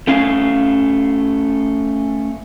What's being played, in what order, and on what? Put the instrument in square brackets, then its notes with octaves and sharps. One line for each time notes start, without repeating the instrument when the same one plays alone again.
[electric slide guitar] A3 C#4 F5